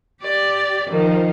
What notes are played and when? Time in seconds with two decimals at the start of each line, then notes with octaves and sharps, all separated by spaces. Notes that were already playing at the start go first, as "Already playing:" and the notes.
0.21 G4 D5
0.88 D#3 F3